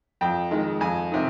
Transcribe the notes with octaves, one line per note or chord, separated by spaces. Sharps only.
F2 G5
D#3 G#3
F2 G#5
C3 D#3